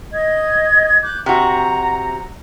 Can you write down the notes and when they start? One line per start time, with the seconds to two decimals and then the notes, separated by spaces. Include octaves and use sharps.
0.13 D#5 G#6
1.03 D6 F#6 G6
1.26 C3 F#4 A#5